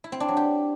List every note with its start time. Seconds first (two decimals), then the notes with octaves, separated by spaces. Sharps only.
0.04 E4
0.12 C4
0.20 D4
0.28 F#3
0.37 G4